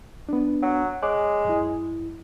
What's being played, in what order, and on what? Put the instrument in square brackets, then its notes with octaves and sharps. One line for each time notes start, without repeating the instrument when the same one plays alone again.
[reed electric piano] B3 D4
[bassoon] F#3
[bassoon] G#3 [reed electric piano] C#5 D6 F#6
[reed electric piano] F#2 E4